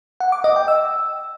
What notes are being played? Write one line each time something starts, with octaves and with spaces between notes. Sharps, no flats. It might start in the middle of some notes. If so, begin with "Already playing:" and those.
F#5
D6
D#5
G5
E6